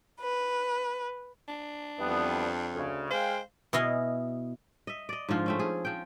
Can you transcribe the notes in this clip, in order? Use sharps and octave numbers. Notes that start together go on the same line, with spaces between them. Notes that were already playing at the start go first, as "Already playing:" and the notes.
B4
D4
F2 E3 G3 B3
D2 C#3
G#3 C5 F5 G5
B2 E4 D#5 F5 G#5
D#5 E5
D5 D#5
G#2 D3 F3 F4
A3 C4 C#4
G#4
F3 G5